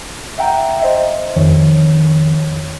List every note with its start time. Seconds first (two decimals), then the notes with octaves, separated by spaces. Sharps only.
0.38 E5 F#5 G5 A#5
0.80 C5 D#5 E5
1.36 F2 D#3 C#5